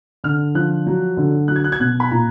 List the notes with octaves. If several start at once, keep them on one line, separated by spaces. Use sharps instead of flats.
D3 F6
F3 F#6
F#3
D3
F#3 F#6
G#6
F#6
G#6
B2 F#6
B5
A#2 A#5